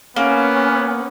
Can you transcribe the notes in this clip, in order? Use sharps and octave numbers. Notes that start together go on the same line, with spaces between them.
A#3 B3 C#4